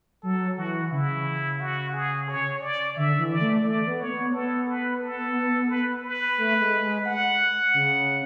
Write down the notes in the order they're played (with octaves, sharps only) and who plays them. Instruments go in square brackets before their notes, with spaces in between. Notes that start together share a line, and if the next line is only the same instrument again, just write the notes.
[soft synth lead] F#3 [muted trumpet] A4
[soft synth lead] E3 [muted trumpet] F#4
[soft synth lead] C#3 [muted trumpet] E4
[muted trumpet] F#4
G#4
C#5
D5
[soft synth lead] D3 [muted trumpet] E5
[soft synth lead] E3
[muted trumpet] D5
[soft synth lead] A3
[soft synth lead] A3 [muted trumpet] D5
[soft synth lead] B3
[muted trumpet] C#5
[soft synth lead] B3
[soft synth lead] B3 [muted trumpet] A4
[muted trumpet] B4
A4
B4
B4
[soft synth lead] A3
G#3
G#3
[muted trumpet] F#5
[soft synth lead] C#3